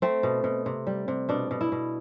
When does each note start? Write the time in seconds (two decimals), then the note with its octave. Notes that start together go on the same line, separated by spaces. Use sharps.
0.02 A3 C4
0.23 B2
0.44 B2
0.66 C3
0.87 G3
1.08 C3
1.29 B2 D4
1.51 B2
1.61 E4
1.72 B2